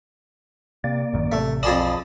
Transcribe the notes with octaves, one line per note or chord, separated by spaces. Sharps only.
C3 A#3 D5
A1 F#2 D#3
A1 C3 A3
B1 F2 G#4 D5 A5 B5 D#6